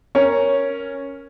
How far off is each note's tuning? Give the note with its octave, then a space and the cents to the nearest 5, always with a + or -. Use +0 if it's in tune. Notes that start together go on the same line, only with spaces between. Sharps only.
C#4 -5 A#4 +0 C#5 +0